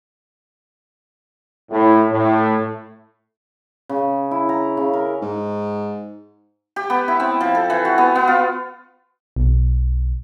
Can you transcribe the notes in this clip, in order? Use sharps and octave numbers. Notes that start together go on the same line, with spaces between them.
A2
A2
C#3
E4
A#5
C#3
A#4
G#2
G4
B3
E4
C4
F3
A4
E3
F#4
B3
B3
F4
B1